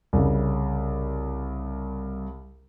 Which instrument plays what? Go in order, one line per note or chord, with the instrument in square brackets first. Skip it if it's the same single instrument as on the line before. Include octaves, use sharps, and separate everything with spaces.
[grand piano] C2 C#3